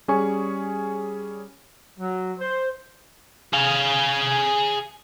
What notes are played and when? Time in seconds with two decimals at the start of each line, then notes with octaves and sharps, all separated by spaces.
0.08 G3 C#4 G#4 C#5 G#5 C#6
1.99 F#3
2.39 C5
3.53 G#4 F5